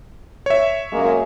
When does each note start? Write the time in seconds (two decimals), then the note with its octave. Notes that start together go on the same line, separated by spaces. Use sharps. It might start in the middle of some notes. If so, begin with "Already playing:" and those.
0.46 C#5 E5
0.92 F#2 G#3 A#3